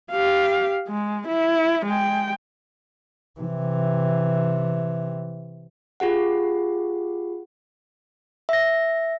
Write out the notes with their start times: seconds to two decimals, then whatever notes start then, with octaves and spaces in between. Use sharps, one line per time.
0.11 G4 F5
0.88 G#3
1.28 E4
1.86 G#3 G5
3.40 C3 E3
6.00 F4 G4 G#4 F#5
8.49 E5 A#6